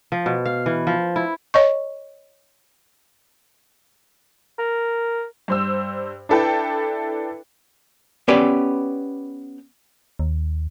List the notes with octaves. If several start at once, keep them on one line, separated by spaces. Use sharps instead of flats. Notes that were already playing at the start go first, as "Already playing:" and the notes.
F3
B2
F5
E3
F3
E4
C#5 D#5 C#6
A#4
G2 C5 E6
D4 E4 A4 B4 G5
B3 C#4 G4 B4 D5
D#2